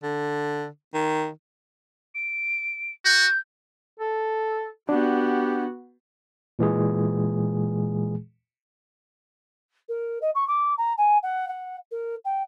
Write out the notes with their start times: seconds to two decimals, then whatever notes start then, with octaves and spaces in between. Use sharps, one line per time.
0.03 D3
0.94 D#3
2.15 D7
3.05 F#4 G6
4.00 A4
4.89 B3 D4 F#4 G4
6.59 A#2 E3 G#3 G#4
9.89 A#4
10.22 D#5
10.35 C#6
10.48 D6
10.78 A#5
10.98 G#5
11.23 F#5
11.48 F#5
11.91 A#4
12.25 G5